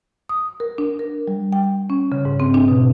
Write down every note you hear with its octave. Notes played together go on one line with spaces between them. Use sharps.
D#6
A#4
D4
A#4
G3
G5
C#4
C#3
G#2
C4
D4
B2